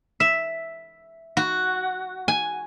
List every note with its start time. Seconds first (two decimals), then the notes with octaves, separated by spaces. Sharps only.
0.20 E5
1.37 F#4
2.28 G#5